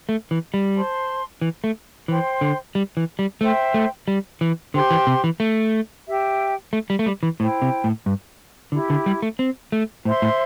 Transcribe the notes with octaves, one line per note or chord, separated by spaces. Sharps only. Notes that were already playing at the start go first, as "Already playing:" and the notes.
A3
E3
G3
C5 A5 C6
E3
A3
E3 C5 G5 C6
D3
G3
E3
G3
A3 C5 E5 G5 C6
A3
G3
E3
D3 G4 C5 G5 C6
E3
C3
E3
A3
G4 E5 G5
A3
G3
A3
G3
E3
A2 E4 C5 G5
C3
A2
G2
D3 E4 G4 E5
D3
G3
A3
C4
A3
A2 C5 E5 C6
A2